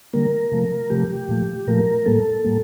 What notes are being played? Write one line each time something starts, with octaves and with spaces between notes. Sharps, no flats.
D3 G3 A#3 A#4
C3 F3 A3
C3 F3 A3 G4
A#2 F3 A3
A#2 F3 A3 A#4
A2 G3 A#3 A4
A2 G3 A#3